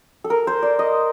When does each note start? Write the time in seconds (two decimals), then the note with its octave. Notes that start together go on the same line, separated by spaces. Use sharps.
0.24 A4
0.30 A#4
0.47 C5
0.63 D5
0.79 D#5